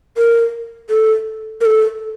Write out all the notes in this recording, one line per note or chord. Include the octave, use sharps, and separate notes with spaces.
A#4
A4
A#4
A4